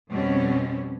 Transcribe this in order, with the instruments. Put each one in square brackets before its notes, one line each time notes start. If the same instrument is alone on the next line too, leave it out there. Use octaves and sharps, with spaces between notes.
[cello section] F2 B2 G3 C4 C#4